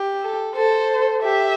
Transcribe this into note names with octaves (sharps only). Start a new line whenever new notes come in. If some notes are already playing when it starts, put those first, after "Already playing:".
Already playing: G4
A4
A4 C5
G4 E5